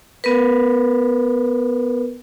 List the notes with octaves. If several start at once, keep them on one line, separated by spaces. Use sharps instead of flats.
B3 A#4 B4